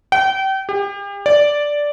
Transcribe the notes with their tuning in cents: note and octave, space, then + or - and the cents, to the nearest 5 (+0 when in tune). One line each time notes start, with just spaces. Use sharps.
G5 -30
G4 +40
D5 -5